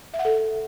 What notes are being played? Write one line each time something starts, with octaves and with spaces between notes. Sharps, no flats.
E5
F#5
A4